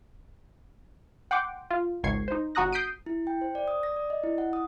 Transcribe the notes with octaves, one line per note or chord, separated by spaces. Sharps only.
F#5 G5 C6 D6
F4
G#1 C#2 C#6 G#6 C7
D#4 C5
G1 F#4 A#5 D#6 F#6 A#6
D#6 G6 B6 C7 D7 D#7
E4
G5
C5
D5
D#6
A#6
D5
D#5
E4
F#5
D#6